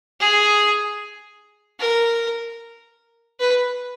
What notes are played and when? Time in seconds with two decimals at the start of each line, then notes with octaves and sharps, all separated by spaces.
0.20 G#4
1.80 A#4
3.40 B4